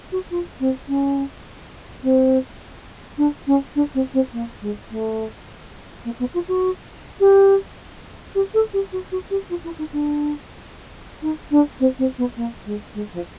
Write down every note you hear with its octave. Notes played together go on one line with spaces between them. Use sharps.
F#4
F4
C4
C#4
C4
D4
C#4
D4
C4
C4
A#3
G#3
A3
A#3
B3
F4
F#4
G4
G4
A4
G4
F#4
F#4
G4
F4
E4
D#4
D4
D#4
D4
C4
C4
B3
A#3
G#3
G#3
F3